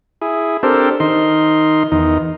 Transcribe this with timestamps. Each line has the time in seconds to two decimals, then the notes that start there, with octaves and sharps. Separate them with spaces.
0.21 E4 G#4
0.63 C4 D4 G4 A4 A#4 C5
1.00 D#3 D#4 C6
1.92 E2 D#3 D#4